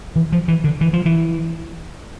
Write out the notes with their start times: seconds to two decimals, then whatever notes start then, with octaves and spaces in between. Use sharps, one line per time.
0.16 E3
0.32 F3
0.48 E3
0.64 D3
0.81 E3
0.93 F3
1.06 E3